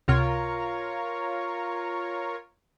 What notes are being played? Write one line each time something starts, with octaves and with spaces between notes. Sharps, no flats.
C#2 C3 F4 A#4 C#5 F6